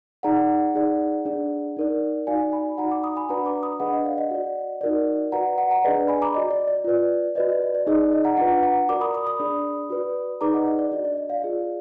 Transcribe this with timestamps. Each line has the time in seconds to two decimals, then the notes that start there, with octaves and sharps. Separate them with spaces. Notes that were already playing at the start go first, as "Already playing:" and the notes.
0.23 D#4 G#4 D5 F#5 A#5
0.75 D#4 G#4 D5
1.25 D4 G#4 D5
1.77 D#4 A#4 D5
2.27 D#4 F#4 D5 F5 G#5
2.52 G#5 B5
2.78 D#4 F#4 D5 F#5 A#5
2.90 A#5 D6
3.03 B5 D#6
3.16 G#5 B5
3.29 D4 F#4 B4 D5 F#5 A#5
3.45 A#5 D6
3.63 B5 D#6
3.80 D4 G#4 B4 D#5 F#5
3.93 D#5
4.05 D5 F5
4.18 D#5 F#5
4.31 F#4 D5
4.81 D#4 F#4 A#4 D5
5.32 F#4 B4 D5 F#5 A#5
5.58 F#5 A#5
5.71 F#5 A#5
5.84 D4 G#4 B4 D5 D#5
5.96 D5
6.08 G#5 B5
6.22 A#5 D6
6.34 F#4 D5 D#5
6.51 D5
6.68 D5
6.84 F4 B4 D5
7.35 F#4 B4 D5 D#5
7.49 D#5
7.62 D#5
7.75 D5
7.87 D#4 G#4 D5 D#5
8.13 D#5
8.24 F#5 A#5
8.37 D4 F4 B4 F#5 A#5
8.63 F#5 A#5
8.89 F#4 A#4 D5 A#5 D6
9.01 B5 D#6
9.14 B5 D#6
9.27 B5 D#6
9.39 D4 G#4 D5
9.90 F#4 B4 D5
10.41 D#4 G#4 B4 D5 A#5 D6
10.54 D#5 F#5
10.67 D#5
10.79 D5
10.92 D4 F#4 D5 D#5
11.05 D5
11.17 D#5
11.30 D5 F5
11.42 F4 G#4 D5